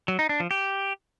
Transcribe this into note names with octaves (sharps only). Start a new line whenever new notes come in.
F#3
D#4
D4
F3
G4